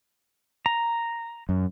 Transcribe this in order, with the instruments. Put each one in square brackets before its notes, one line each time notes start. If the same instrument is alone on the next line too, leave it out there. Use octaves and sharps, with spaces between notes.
[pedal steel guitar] A#5
[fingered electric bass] F#2